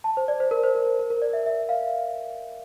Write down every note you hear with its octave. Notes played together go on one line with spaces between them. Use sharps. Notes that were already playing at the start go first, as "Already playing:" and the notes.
A5
C5
D5
C5
A#4
C5
A#4
A#4
A#4
A#4
D5
E5
E5
F5